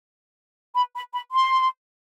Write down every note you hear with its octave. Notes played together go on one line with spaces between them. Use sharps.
B5
B5
B5
C6